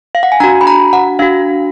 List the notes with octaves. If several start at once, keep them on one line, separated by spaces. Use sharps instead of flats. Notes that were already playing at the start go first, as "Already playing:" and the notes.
F5
F#5
G#5
D4 F#4 A#5
B5
A#5
F#5
D4 F#4 F5